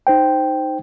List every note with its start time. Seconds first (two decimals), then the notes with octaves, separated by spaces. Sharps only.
0.07 D#4 C5 G5